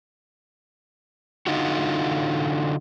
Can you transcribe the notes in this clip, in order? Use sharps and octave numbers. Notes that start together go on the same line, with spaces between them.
D3 D#4 F4 F#4